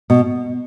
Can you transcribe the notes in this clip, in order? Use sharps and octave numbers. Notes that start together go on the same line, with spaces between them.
B2